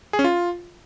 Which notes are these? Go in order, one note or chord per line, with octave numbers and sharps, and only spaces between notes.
G#4
C#4
F4